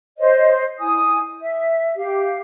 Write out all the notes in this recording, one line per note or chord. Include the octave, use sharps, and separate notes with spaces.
C5 C#5 D#5
E4 G#5 D#6
E5
G4 F5